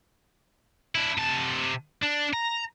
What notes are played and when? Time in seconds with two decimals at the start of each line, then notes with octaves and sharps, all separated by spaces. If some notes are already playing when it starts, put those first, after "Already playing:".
0.95 D4 E4
1.18 C3 A5
2.02 D4
2.33 A#5